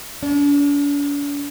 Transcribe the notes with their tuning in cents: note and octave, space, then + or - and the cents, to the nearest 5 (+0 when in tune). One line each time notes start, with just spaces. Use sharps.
D4 -45